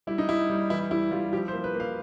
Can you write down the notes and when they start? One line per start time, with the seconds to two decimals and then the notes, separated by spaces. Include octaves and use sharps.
0.07 G3 E4
0.18 D#4
0.28 G3 E4
0.50 G3
0.70 E3 E4
0.91 G3 E4
1.11 G3 F4
1.33 F3 G4
1.48 C5
1.53 A#3
1.64 B4
1.74 A#3
1.80 F5